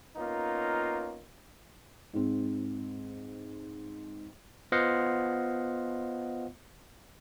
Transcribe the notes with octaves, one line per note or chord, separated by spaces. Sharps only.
A#3 B3 C#4 D#4 F4
G#2 C4
B3 F4 C5 D#5 F5 F#5